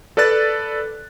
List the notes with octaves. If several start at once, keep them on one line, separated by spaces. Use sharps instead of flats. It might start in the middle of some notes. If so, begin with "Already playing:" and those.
A4 B4 D5 F#6 A6